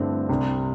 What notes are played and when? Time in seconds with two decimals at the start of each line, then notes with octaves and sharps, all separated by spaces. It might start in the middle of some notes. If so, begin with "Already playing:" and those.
Already playing: G2 D3 A3 C4 E4
0.29 C2 C3 G3 D4